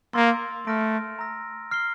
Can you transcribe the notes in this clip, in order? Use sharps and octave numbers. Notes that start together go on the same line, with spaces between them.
A#3 C6 E6 A6
A3 F6 A#6 D7
A#5 E6 A#6
F6 C7 G7